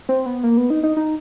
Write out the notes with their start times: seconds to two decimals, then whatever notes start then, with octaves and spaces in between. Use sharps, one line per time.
0.09 C4
0.26 B3
0.43 A#3
0.57 B3
0.70 D#4
0.83 D#4
0.97 D#4